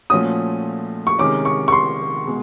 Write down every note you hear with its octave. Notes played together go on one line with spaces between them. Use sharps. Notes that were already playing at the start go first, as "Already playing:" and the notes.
A#2 F3 A3 C#4 F#4 D#6
C#6
C3 D#3 G#3 C#4 D6
C#6
C#6
C6
B2 G#3